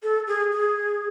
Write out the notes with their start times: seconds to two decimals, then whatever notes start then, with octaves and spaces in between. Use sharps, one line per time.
0.03 A4
0.27 G#4
0.52 G#4